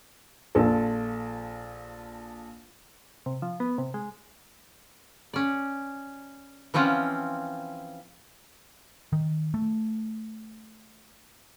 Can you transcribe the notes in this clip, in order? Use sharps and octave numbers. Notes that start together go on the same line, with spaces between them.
A#1 F4 A4
C3
F3
B3
C3
G#3
C#4 D5
E3 F3 C4 C#4 F4 F#5
D#3
A3